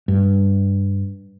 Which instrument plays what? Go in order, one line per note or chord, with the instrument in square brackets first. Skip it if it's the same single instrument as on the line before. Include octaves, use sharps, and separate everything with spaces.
[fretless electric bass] G2